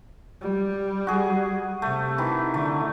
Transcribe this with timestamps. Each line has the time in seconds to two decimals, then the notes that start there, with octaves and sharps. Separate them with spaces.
0.41 G3
1.07 F#4 G#4
1.82 C3 A3
2.18 D#3 E3
2.54 D3 A3